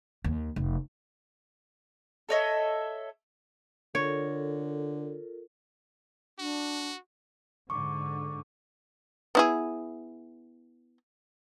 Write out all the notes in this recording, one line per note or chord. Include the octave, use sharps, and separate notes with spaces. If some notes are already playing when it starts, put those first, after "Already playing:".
D#2
F1
A4 C#5 D#5 E5
D3 F4 A4 A#4 C#5
D4 F#4
G#2 D3 C#6 D6
B3 E4 G#4